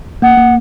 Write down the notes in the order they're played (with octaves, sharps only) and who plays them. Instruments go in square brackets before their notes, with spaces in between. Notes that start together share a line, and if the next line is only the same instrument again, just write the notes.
[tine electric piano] A#3 [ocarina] F#5
[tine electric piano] A#3